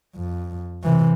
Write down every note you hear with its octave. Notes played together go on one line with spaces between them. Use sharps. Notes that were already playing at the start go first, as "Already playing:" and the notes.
F2
C3 E3